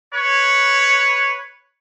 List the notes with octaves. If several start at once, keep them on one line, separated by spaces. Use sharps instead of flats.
B4 C#5